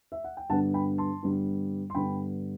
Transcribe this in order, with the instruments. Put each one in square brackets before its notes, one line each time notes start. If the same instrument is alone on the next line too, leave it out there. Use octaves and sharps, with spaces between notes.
[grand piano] E5
F#5
G5
G2 D3 G3 B3 D4 F#5 A5
G5 B5
A5 C6
G2 D3 G3 B3 D4
C6
G2 D3 G3 B3 D4 G5 B5